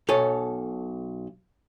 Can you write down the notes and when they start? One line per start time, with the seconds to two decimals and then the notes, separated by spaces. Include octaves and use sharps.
0.09 B1 A4 C#5 G#5